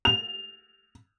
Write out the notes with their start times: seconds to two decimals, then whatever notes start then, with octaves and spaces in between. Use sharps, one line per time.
0.05 F7